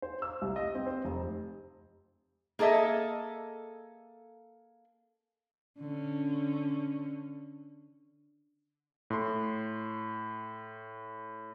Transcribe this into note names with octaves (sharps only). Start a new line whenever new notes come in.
C5
E6
C2
D#5
C4
C5
F1
A#3 G#4 A4 D#5 E5
D3 C#4
A2 C6